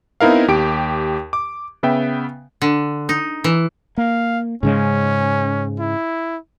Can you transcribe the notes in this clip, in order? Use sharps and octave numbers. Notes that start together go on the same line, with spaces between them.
B3 C4 D#4 E4 A#4 F5
D#2 G4 D7
D6
C#3 B3 E5 G5
D3
D#4
E3
A#3 F5
G#2 C#3 G#3 C#4
E4